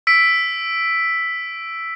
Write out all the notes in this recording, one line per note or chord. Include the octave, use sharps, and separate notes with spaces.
E6 B6 D7